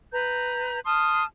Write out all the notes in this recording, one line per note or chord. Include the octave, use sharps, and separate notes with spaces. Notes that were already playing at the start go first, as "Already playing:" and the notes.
B4 A#5 G6
A5 C6 D#6 F6